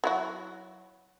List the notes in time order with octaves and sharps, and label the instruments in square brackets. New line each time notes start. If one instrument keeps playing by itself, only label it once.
[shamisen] F#3 E4 F#4